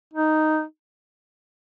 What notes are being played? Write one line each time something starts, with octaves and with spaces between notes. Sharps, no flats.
D#4